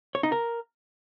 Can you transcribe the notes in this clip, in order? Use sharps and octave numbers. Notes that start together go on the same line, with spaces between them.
C#5
D#4
A#4